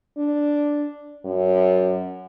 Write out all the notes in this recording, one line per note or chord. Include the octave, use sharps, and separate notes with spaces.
D4
F#2